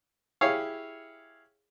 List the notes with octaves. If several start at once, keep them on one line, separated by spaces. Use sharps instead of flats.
E4 G4 G#4 C#5 F5